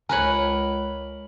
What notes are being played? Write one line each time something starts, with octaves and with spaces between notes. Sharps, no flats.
C#2 A#4 B4 C#5 G#5 F#7